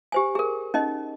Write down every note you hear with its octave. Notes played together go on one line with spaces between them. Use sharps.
G4 C5 G#5
G#4 A#4
C#4 D#4 D#5